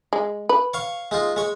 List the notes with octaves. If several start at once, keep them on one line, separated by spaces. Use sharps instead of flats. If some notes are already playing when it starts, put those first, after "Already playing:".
G#3
B4
C#5 F5 C#6
G#3 D#4 F4
G#3 C#5